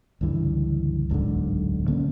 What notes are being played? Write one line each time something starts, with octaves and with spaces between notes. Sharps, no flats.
C#2 G2 D3 E3
D1 B1 G#2 D3
D3 A#3 C#4